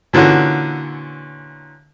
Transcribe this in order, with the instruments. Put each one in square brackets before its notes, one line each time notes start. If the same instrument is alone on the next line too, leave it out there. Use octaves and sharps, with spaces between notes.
[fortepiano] A#2 D3 E3 C#4 F#4